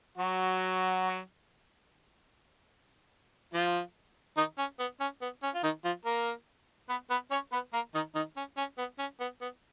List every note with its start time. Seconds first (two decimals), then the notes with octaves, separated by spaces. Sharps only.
0.18 F#3 F#4
3.54 F3 F4
4.37 D#3 D#4
4.58 C#4
4.79 B3
5.00 C#4
5.22 B3
5.43 C#4
5.55 F4
5.63 D#3 D#4
5.85 F3 F4
6.05 A#3 A#4
6.89 B3 B4
7.10 B3 B4
7.31 C#4 C#5
7.52 B3 B4
7.73 A#3 A#4
7.94 D#3 D#4
8.15 D#3 D#4
8.37 C#4
8.57 C#4
8.78 B3
8.99 C#4
9.20 B3
9.41 B3